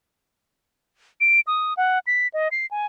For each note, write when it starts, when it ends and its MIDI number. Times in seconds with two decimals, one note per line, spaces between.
1.21 1.40 98
1.47 1.74 87
1.77 1.99 78
2.07 2.28 95
2.34 2.48 75
2.52 2.66 96
2.71 2.86 80